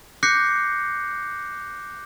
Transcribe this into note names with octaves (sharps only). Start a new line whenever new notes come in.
D6 F#6 G6 A#6 C7 C#7